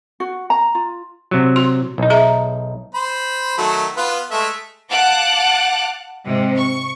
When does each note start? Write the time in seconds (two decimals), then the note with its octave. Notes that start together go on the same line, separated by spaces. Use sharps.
0.20 F#4
0.50 A#5
0.75 F4
1.31 C3 F#3
1.56 F#4 C6
1.98 B1 D#4
2.10 G#4 E5 A#5
2.94 C5 B5
3.58 D#3 F#3 A3
3.97 B3 F4 B4
4.31 G#3 A3 E5
4.91 F5 F#5 A5 D6 F#6
6.25 G#2 C3
6.56 C#6